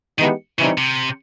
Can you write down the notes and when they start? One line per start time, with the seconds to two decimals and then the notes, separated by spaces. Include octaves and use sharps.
0.19 D#3 E3 G#3 B3 D#4 G4
0.59 C#3 E3 G3 C4 D#4
0.78 C3